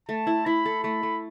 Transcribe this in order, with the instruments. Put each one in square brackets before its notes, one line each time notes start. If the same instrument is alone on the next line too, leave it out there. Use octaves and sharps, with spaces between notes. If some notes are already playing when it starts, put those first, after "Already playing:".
[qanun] A3 [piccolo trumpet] A5
[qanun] E4
[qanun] E4 [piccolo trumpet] B5
[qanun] A4
[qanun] A3 [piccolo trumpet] B5
[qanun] A3